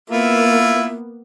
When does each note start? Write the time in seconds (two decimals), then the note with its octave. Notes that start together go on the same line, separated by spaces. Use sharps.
0.10 A#3 B3 E4 F4 E5